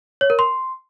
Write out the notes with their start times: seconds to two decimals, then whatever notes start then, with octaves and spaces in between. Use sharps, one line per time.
0.21 C#5
0.30 A#4
0.39 C6